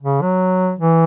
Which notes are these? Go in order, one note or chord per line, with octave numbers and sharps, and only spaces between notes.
C#3
F#3
E3